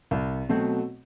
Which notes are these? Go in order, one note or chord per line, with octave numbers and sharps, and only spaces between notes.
C2
B2 F#3 A3 C4